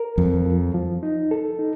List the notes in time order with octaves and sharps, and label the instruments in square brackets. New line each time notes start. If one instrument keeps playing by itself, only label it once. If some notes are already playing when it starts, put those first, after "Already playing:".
Already playing: [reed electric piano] A#4
[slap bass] F2 [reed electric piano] F3
[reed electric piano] F3
F3
D#4
A4
D#4